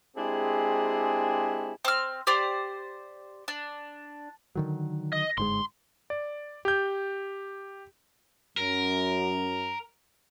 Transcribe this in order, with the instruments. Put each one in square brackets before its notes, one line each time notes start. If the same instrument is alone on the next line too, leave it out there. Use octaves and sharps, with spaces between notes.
[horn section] G#3 C4 D4 E4 G4 G#4
[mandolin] C4 F6
G4 C5 D5
D4
[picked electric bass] D3 D#3 F#3
[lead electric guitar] D#5
[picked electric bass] G1 G#2 G#3 [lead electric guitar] C6
[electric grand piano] D5
G4 G6
[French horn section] F#2 [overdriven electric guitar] A#4